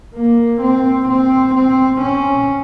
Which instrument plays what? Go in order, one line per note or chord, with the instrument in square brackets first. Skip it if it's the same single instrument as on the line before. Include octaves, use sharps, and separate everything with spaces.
[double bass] A#3
C4
C4
C4
C#4